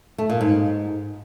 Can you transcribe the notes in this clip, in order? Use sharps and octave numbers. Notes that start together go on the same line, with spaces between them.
A3
A#2
G#2